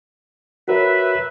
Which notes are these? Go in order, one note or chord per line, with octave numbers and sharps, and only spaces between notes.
F#4 A#4 B4 C#5 E5